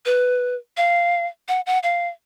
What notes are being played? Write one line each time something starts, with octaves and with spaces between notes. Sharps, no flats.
B4
F5
F#5
F#5
F5